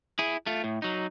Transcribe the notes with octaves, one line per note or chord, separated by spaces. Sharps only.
E4 G#4
A3 F4
A2
F#3 D#4